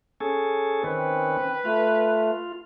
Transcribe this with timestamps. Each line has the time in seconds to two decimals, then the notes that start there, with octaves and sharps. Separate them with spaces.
0.20 C#4 G#4 A4
0.84 D#3 C4 C#4 B4
1.65 A3 F4